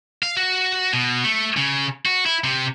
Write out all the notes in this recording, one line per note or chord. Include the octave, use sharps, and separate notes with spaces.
F5
F#4
B2
A3
C#3
F#4
E4
C3